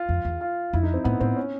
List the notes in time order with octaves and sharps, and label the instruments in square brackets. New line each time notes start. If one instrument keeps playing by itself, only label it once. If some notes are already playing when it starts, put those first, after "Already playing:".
Already playing: [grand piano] F4
[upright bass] F2
E2
[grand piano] F4
[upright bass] F2 [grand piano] E4
[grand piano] D#4
C4
[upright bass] A2 [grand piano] B3
[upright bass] A2 [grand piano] C4
[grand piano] C#4